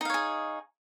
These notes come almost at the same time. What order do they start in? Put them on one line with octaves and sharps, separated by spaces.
D#4 F5 C#5 G#4